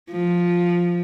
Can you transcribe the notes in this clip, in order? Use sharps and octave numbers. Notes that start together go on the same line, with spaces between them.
F3